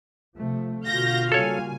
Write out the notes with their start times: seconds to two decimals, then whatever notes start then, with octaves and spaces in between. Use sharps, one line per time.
0.37 C3 F3 A3
0.85 B2 D3 F4 F#4 F5 G6 A#6
1.32 C#3 G3 A#3 A4 C#5 G#5